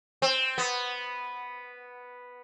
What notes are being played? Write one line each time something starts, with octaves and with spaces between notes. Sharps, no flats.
C4
B3